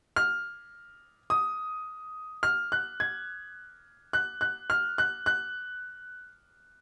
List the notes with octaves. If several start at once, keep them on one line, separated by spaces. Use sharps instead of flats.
F6
D#6
F6
F#6
G#6
F#6
F#6
F6
F#6
F#6